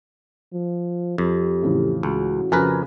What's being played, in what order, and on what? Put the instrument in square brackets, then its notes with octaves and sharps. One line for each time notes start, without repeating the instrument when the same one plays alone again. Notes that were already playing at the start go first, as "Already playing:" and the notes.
[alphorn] F3
[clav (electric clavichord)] F2 [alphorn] G4
[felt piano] A2 C#3 E3
[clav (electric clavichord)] C#2 [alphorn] F#4
[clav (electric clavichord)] F2 A#4 B4 [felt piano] C#3 G#5